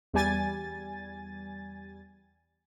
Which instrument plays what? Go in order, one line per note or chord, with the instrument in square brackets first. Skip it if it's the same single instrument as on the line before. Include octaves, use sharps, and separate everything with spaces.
[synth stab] E2 G3 G#5 A6